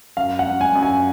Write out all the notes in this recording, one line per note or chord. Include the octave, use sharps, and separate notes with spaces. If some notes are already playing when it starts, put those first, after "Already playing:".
F#2 F5
F#5
F#2
G#5
F#2
G#5